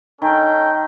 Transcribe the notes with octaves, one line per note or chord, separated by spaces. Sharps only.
D#3 C#4 A4 G5